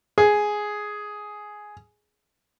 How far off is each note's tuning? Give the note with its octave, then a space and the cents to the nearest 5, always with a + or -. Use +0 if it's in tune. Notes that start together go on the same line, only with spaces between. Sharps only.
G#4 +5